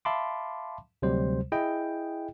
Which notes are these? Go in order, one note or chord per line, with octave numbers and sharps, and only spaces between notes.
E5 F5 A5 B5 C6 D6
D2 C3 F#3 G3 C5
E4 G#4 D#5 G5